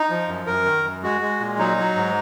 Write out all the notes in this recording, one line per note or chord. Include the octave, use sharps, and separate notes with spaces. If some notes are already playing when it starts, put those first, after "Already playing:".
Already playing: D#4
F3
F#2
F#2 A#4
D#3
F#2
G#3 F#4
G#3
A#2
F#3 D#4
F#3
G#2